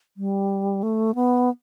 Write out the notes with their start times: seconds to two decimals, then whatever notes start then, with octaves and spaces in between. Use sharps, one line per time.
0.17 G3
0.83 A3
1.15 B3